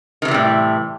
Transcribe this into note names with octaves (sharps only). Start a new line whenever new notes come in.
A2 C3 D#3 E3 G3